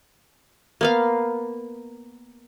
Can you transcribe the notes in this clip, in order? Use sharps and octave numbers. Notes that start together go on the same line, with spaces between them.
A#3 B3 F5